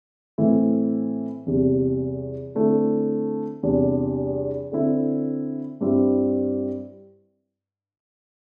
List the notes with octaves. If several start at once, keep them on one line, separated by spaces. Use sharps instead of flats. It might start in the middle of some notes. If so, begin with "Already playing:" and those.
A2 E3 A3 C4 E4
E2 C3 G3
D3 A3 C4 E4
E2 C3 G3 D4
D3 C4 E4
G2 G3 C4 E4